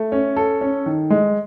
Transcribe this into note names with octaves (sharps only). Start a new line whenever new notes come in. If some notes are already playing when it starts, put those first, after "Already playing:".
Already playing: A3
C#4
A4
C#4
D#3
G#3